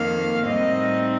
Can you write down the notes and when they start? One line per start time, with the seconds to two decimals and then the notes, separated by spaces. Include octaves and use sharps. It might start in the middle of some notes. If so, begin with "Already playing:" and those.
Already playing: F2 D#3 A#3 F5
0.45 A2 G3 C4 D#4 D#5